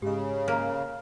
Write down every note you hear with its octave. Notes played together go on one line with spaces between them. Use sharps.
G#2 C#3 G4 D#5
A#3 F5 A#5